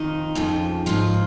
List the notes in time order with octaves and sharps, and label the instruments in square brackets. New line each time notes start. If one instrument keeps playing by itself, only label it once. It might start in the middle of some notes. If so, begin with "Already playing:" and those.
Already playing: [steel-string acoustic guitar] F2 D#3 D#4
F2 C#3 F3
G#2 F3 F4